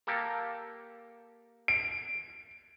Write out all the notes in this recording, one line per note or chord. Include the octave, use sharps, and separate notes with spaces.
A#3 G4 A4
D7